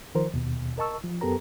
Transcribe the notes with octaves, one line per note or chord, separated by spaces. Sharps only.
D#3 F3 A#4 C5
D#2 B2
A#4 D#5 A5 C#6 E6
F3
F#2 B3 G4 A4 A#4 A#5